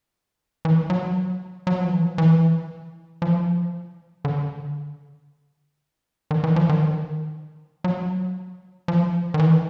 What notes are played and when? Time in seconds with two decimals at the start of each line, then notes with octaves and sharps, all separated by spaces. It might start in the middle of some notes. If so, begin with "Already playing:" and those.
0.65 E3
0.90 F#3
1.67 F#3
1.78 F3
1.89 E3
2.00 F3
2.18 E3
3.22 F3
4.25 D3
6.31 D#3
6.44 E3
6.56 F3
6.69 D#3
7.84 F#3
8.88 F3
9.34 D#3
9.39 E3